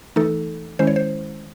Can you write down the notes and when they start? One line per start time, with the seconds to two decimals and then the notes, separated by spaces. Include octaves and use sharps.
0.16 E3 A3 D#4 A4
0.79 D#3 G#3 C#4 E4 C5
0.87 C#5
0.96 C5